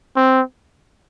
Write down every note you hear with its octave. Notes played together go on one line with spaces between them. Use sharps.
C4